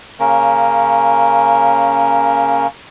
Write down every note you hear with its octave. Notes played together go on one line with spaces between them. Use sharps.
C#3 A#3 C#4 A#4